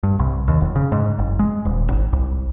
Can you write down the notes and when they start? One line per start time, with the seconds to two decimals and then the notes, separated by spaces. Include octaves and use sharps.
0.03 G2
0.19 C2
0.48 D#2
0.61 F1
0.76 C#3
0.92 G#2
1.19 F#1
1.39 G#3
1.65 D#1
1.90 G#1
2.13 C2